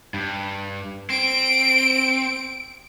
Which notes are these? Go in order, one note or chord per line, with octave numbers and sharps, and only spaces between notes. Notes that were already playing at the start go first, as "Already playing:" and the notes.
G2
C4 D7